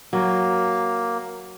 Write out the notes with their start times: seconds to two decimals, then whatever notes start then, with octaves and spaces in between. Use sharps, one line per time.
0.13 F#3 A#3